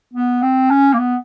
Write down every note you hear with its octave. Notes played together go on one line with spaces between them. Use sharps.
B3
C4
C#4
A#3
B3